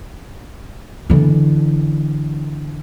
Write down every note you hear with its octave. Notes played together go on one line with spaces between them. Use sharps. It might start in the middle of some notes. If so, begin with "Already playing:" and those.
D3 E3